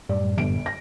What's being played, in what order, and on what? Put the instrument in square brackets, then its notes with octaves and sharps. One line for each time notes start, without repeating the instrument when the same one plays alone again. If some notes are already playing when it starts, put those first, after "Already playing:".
[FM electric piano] F#2 A2 G3 [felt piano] D5
[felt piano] G1 D7
A#6